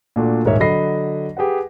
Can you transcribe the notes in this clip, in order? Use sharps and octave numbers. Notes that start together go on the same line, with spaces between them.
A#2 A3 D4 F4 F#4
D#1 G#2 A#4 C#5 E5
D3 F#3 D#5 B5 A#6 C7
G4 G#4 B4 F#5